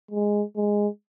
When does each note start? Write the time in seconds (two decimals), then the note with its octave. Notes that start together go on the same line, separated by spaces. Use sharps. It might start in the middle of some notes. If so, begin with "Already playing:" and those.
0.11 G#3
0.56 G#3